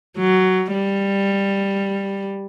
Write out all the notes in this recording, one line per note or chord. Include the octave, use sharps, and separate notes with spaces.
F#3
G3